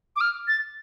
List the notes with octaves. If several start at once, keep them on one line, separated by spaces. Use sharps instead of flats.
D6
F6
A6